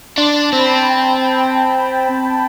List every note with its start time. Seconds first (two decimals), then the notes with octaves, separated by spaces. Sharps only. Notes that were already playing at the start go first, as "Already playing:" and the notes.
0.18 D4 C6
0.36 A5
0.53 C4 B5
0.70 A5
0.87 G5
1.21 G5